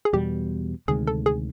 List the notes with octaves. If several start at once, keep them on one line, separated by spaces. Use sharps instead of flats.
G#4
E2 B2 G3 G4
D2 C3 D#3 G#3 G#4
A4
G#4